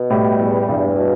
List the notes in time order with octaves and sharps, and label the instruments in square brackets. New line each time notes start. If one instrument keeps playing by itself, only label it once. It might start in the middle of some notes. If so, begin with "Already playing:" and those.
Already playing: [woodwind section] B2
[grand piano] A2 [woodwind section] G3
[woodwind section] E2
[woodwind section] E2 [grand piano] G2
[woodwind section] B2